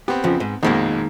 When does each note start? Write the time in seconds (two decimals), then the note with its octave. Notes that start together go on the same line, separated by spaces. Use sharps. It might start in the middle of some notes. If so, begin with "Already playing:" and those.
0.08 B3 C4 G4
0.24 F2 C#3 F3
0.40 G#2
0.63 A#1 F2 B2 D#3 G#3 A#3